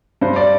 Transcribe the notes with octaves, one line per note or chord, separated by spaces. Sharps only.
G2 C5
D5